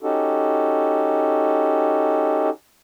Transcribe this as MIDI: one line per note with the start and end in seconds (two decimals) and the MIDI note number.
0.02 2.50 61
0.02 2.50 63
0.02 2.50 66
0.02 2.50 67
0.02 2.50 69